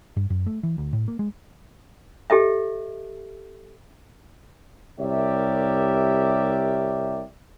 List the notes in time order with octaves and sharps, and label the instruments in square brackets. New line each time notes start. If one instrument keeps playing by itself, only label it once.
[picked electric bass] G2
F#2
A3
E3
D2
A2
A#3
G#3
[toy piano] G4 A4 D#5 E5
[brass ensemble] C2 G4 A#4 C#5 D5 E5